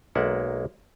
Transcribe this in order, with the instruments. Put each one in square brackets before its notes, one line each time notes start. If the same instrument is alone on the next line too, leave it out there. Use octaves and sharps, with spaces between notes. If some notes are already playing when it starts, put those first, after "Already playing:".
[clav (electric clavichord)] B1 G#3 A#3 D5 E5 F#5